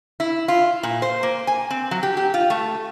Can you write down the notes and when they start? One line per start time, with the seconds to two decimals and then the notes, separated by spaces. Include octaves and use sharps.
0.20 E4
0.48 F4
0.83 A#2
1.02 C5
1.23 A#3
1.47 G#5
1.71 C4
1.91 F#3
2.03 G4
2.17 G4
2.34 F4
2.50 A3